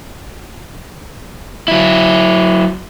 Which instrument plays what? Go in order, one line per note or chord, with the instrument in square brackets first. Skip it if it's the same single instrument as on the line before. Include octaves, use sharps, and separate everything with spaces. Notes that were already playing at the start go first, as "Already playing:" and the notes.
[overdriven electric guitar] F#3 E4